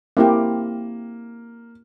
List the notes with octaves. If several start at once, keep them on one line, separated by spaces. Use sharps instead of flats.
A#3 C4 E4 G4